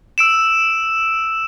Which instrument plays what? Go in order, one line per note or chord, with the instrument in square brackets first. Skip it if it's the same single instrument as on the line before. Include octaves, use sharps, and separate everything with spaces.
[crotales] E6 D7 E7